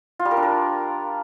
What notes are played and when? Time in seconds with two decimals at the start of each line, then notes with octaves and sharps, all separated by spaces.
0.19 F4
0.25 G3
0.31 A#4
0.37 D4
0.43 A#4